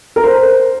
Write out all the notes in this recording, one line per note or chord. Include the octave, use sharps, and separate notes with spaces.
A#4
C5